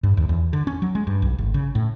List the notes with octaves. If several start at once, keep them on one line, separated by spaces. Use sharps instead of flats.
G2
D#2
E2
D3
C#4
F#3
G#3
G2
B1
G#1
C#3
A2